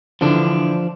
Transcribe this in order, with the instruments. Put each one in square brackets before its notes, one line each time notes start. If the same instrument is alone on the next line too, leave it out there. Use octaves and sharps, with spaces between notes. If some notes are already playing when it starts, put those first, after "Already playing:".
[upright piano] D3 E3 [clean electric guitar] F3 D4